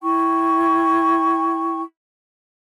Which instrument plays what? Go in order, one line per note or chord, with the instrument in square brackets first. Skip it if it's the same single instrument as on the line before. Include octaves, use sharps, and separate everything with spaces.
[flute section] E4 G5 C#6